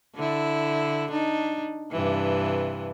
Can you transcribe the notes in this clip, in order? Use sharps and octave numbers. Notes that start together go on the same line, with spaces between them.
D3 E4
D4 D#4
G2 C3 E3